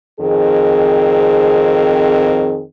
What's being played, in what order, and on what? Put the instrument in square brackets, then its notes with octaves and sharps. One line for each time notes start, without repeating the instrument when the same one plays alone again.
[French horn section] F2 D#3 C4 G#4